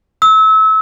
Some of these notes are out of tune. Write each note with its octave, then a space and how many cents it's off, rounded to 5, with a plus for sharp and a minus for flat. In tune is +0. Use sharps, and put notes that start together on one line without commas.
E6 -30